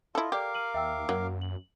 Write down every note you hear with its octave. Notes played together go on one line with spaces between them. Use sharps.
E4 F4 A4 D#5
G4 A4 A#4 D5 F5 D6
F6 D#7 F#7
D#2 E5 G5 E6
F#2 F#3 A#3
F#7